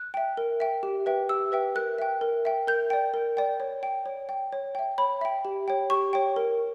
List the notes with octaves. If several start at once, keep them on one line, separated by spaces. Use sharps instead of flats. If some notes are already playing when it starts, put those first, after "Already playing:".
Already playing: F#6
E5 G5
A#4
E5 G5
G4
B4 E5 G5
G4 E6
B4 E5 G5
A#4 F#6
E5 G5
A#4
E5 G5
A#4 G6
D5 G5
A#4
D5 G5
C#5
G5
C#5
G5
C#5
E5 G5
C#5 B5
E5 G5
G4
C#5 G5
G4 C#6
C#5 G5
A#4